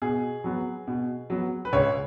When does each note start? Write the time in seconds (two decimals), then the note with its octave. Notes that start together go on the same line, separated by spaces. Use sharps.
0.02 B2 G#4
0.44 F#3 B3
0.87 B2
1.30 F#3 B3
1.65 B4
1.73 C#2 C#5